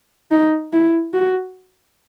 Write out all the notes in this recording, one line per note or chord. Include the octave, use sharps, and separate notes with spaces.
D#4
E4
F#4